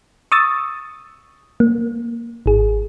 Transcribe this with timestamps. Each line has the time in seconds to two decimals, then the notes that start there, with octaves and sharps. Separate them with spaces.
0.32 C#6 D#6 E6 A6
1.60 A#3
2.46 G#1 G#4